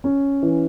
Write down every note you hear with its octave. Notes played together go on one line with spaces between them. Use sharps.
C#4
E3